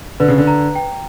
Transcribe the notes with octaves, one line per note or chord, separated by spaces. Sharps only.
D3 B4
C#3
D3
A#5
G5